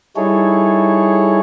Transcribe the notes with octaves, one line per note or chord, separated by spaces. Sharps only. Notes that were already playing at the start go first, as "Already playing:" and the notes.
G3 D#4 E4 G#4 A4 C#5